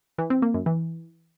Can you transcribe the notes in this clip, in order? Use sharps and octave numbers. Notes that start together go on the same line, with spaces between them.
E3
C4
A#3
F#2
E3